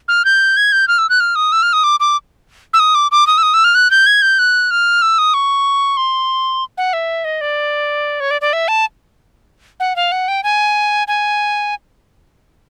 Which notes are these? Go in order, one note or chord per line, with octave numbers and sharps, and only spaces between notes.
F6
G6
G#6
G6
F6
E6
F#6
F6
D#6
E6
F6
D#6
D6
D6
E6
D#6
D6
D6
D#6
E6
D#6
E6
F6
F#6
G6
G#6
G6
F#6
F6
E6
D#6
C#6
C6
F#5
E5
D#5
D5
C#5
D5
D5
E5
A5
F#5
F5
F#5
G5
G#5
G#5